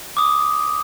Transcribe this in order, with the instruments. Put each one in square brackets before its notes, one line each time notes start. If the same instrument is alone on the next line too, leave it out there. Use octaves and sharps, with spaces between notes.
[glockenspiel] D6 D#6